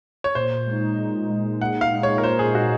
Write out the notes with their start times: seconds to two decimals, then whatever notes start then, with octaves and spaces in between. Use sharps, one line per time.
0.24 C#5
0.35 A#2 C5
0.67 G#3 D#4
0.98 A#2
1.29 G#3 D#4
1.61 A#2 F#5
1.81 F5
1.93 G#3 D#4
2.03 C#5
2.18 A#4
2.23 A#2 C5
2.39 G#4
2.55 G#3 D#4 F#4